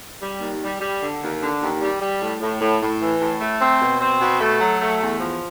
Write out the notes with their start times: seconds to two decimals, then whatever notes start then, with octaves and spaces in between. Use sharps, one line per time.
0.21 G3
0.41 D#2
0.62 G3
0.81 G3
1.01 D3
1.21 D#2
1.42 D3
1.61 D#2
1.80 G3
2.01 G3
2.21 A2
2.41 A2
2.61 A2
2.81 A2
3.01 E3
3.21 A2
3.41 A3
3.60 C4
3.81 B2
4.00 C4
4.21 B2
4.41 A3
4.60 F#3
4.80 A3
5.01 E2
5.20 F3